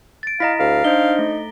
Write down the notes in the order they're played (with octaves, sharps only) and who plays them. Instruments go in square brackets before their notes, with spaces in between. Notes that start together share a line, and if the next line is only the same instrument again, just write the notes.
[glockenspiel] A6 D7
[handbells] E4 D#5 [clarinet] F5 [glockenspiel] A#5 A#6 B6
[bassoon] D2 [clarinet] F5
[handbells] D4 C5 [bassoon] D#4 [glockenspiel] G7
[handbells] A3